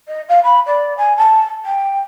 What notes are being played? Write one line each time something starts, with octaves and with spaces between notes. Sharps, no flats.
D#5
F5
B5
D5
G#5
A5
G5